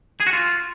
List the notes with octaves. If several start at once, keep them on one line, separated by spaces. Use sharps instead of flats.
G#4
F#4
F4